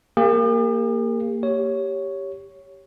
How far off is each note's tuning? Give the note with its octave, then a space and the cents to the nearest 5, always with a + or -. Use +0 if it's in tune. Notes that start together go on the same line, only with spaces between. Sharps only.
A#3 -15 G4 +45
G4 +0 C#5 +5